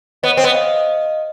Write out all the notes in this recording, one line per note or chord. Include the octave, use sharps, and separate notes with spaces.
B3 C#5 D#5
C4
B3
D#5 F5